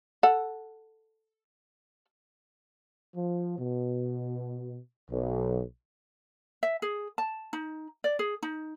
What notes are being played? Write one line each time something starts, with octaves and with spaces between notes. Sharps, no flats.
A4 F#5
F3
B2
B1
E5
G#4
A5
D#4
D5
G#4
D#4